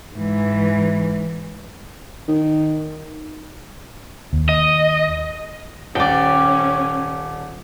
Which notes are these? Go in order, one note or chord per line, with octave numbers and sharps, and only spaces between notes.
G#2 E3
D#3
D#2
D#5
D#1 C#4 D5 G5